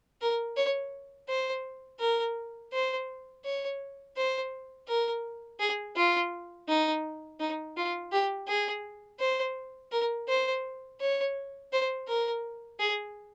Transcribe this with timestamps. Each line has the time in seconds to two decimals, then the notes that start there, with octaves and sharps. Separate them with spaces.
0.21 A#4
0.57 C#5
1.29 C5
2.00 A#4
2.73 C5
3.45 C#5
4.17 C5
4.88 A#4
5.60 G#4
5.96 F4
6.68 D#4
7.40 D#4
7.77 F4
8.12 G4
8.48 G#4
9.20 C5
9.92 A#4
10.28 C5
11.01 C#5
11.73 C5
12.08 A#4
12.80 G#4